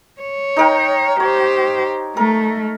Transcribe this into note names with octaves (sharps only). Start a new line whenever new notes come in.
C#5
D#4 A#4 G5
G4 C5 C#5
A3 A#4